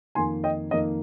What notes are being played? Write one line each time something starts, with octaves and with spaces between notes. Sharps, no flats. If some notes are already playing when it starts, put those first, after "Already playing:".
F2 D#3 A#3 G#5 C6
D#5 G5
F2 D#3 A#3 D#5